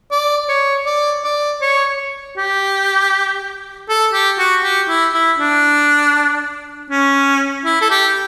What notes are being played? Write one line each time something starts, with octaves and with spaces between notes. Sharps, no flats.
D5
C#5
D5
D5
C#5
G4
A4
G4
F#4
G4
E4
E4
D4
C#4
E4
A4
G4